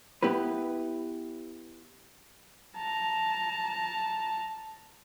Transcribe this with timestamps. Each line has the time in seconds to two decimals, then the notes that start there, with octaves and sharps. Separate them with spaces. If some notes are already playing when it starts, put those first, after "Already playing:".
0.23 B3 E4 G4 B4
2.77 A5 A#5